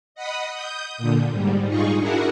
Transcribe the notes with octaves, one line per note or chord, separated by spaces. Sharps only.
D#5 F#5 B5 D#6
D#6 G6
A#2 D3
G#2 G3
D#4 F4 G#4 C#6
D4 E4 F#4 G#4 A#4 F#5